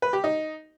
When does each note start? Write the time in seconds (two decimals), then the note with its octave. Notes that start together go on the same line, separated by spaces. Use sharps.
0.02 B4
0.13 G4
0.24 D#4